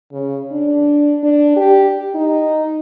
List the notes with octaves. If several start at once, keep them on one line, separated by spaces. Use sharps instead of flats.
C#3
D4
D4
G4
D#4